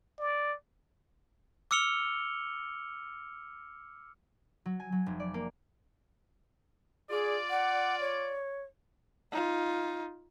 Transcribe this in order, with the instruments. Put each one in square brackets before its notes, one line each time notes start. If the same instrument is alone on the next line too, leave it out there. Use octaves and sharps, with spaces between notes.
[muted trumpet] D5
[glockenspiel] D6 E6 F6 C#7 F7 G7
[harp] F#3
G#5
F#3
F1
D5
A#3
[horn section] F4 D5 [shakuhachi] G#4
[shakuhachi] F#5
C#5
[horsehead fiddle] D#4 F4